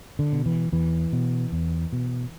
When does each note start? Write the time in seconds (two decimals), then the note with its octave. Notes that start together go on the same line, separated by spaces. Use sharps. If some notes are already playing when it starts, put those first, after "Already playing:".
0.19 D3
0.33 B2
0.46 E3
0.72 E2 E3
1.13 B2
1.52 E2
1.93 B2